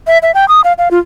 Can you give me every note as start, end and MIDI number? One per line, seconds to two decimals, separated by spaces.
0.07 0.18 76
0.23 0.31 76
0.35 0.48 79
0.48 0.61 87
0.64 0.73 77
0.78 0.89 77
0.91 0.99 65